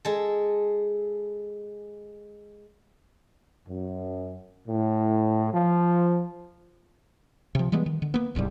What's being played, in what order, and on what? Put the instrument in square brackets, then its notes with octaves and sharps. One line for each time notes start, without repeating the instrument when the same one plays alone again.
[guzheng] G#3 A4
[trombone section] F#2
A2
F3
[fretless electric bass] C3 F3
E3 G3 G#3 B3
D#3
D3
A#3 B3
D1 C2 G#2 G3